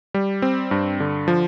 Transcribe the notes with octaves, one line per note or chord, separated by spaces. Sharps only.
G3
C4
G2
D3
F3